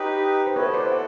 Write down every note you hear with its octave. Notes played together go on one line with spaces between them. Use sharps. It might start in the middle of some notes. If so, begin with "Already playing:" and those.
Already playing: D#4 G4 B4 C#5
C5
B3 E4 A4 B4 C#5
C5 D5
F#5